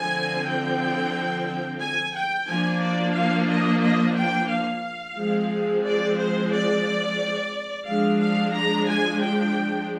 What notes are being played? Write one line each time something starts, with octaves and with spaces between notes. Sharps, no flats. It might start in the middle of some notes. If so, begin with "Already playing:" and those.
Already playing: D3 F3 C4 G#5
G5
G#5
G5
F3 A#3 D4 G#5
D5
F5
D#5
D#5
G5
F5
F3 G#3 C4
D5
C5
D5
F3 G#3 D4 F5
F5
A#5
G#5
G5